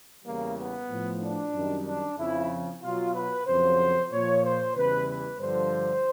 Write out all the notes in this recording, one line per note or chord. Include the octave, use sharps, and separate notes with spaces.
E2 C#3 E3 G3 A#3
B3
A2 F3
D4
F#2 D#3 G3
D4
F2 C#3 F3 E4
B2 F#3 F4
B4
F2 C#3 F#3 C5
A#2 F3 C#5
C5
E2 C#3 E3 G3 B4
B4
G2 D3 F3 C5